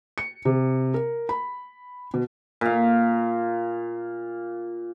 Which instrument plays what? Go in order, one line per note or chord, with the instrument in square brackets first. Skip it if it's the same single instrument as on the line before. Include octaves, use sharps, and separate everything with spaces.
[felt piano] C#7
C3
A#4
B5
B2
[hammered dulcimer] A#2 F5